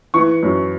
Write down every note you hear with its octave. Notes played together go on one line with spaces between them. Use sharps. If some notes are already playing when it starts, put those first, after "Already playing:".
E3 C#6
F#2